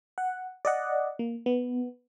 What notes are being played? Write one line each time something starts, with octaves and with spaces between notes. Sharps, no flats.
F#5
D5 D#5 F#5
A#3
B3